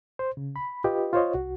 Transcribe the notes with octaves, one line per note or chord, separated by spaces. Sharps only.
C5
C#3
B5
F4 G4 B4 D#5
F4 C5 C#5 D#5
C2 F#4